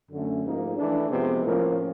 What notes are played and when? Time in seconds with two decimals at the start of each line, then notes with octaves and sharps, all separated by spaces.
0.11 F#2 D3 F#3 A3 C#4
0.43 G#2 F3 A#3 D#4
0.76 E3 A3 D4
1.10 C3 F3 G#3 B3
1.43 A2 F3 A#3 C#4